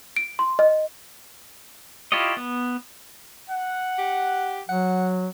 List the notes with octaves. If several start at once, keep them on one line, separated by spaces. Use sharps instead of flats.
D7
C6
D#5
E4 F4 G4 C#5 D#5
B3
F#5
G4
F#3 F#5